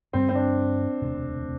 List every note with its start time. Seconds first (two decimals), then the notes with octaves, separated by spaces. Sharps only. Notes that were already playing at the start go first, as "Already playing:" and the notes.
0.13 G2 D3 G3 C4
0.29 C4
0.35 D4
1.02 E1 D2 C3